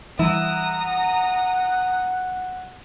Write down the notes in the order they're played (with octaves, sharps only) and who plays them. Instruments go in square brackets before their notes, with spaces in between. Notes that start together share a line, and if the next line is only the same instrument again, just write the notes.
[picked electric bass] E3 G3 [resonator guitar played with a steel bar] E4 [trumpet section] F#5 [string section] A#5 D#6